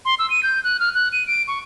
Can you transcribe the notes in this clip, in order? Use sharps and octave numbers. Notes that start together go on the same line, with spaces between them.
C6
E6
D#7
G6
F#6
F6
F#6
D#7
D7
C#6